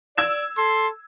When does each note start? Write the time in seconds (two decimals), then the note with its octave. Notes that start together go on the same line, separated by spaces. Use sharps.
0.18 D5 E6 G#6 E7
0.57 A4 C6